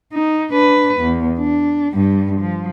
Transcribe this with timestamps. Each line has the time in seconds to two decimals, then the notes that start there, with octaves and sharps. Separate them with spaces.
0.13 D#4
0.52 D4 B4
1.01 E2
1.39 D4
1.94 G2 G3
2.40 F3